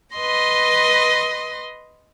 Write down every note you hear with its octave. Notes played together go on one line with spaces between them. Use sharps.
B4 D#5 C6 A#6